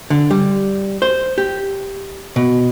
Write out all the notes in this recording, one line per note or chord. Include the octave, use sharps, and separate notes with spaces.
D3
G3
C5
G4
B2